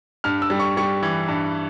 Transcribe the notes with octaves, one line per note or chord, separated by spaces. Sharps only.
G2 F6
E6
G3
C#6
G3 C#6
E3
G2